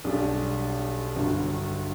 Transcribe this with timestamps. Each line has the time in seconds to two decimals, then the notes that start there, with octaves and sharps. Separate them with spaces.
0.04 B1 B2 G3 D4 F#4
1.16 G1 G2 F#3